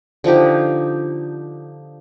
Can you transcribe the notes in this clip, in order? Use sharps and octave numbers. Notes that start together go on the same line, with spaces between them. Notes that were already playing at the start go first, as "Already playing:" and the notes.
D3 F3 D#4 G4